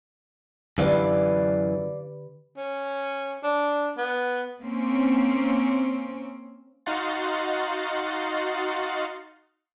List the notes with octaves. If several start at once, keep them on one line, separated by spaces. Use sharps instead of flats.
F#2 D3 E3 G4 B4 D5 F5
C#4
D4
B3
A#3 C4 C#4
D#4 F#4 F5 F#5 C6 A6